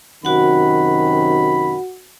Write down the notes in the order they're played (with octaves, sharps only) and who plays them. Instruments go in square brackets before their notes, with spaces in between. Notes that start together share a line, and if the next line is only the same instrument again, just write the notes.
[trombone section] F#2 C3 D#3 [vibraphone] F#4 F#5 [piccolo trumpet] B5